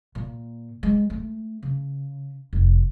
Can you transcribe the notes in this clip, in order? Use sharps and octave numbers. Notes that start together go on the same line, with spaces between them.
A#2
G#3
A3
C#3
F1